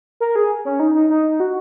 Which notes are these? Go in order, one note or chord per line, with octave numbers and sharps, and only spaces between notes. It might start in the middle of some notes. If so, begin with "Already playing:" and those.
A#4
G#4
C#4
D#4
D#4
D#4
F#4